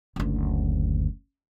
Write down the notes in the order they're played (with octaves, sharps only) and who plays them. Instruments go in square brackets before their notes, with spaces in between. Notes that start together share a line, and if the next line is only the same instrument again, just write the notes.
[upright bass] F#1 D2